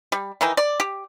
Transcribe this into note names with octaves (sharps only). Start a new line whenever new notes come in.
G3
D#3 E3 D#4
D5
G4